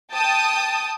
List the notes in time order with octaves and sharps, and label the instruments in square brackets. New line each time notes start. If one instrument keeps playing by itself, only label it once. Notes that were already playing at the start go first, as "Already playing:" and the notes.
[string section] G5 A5 D#6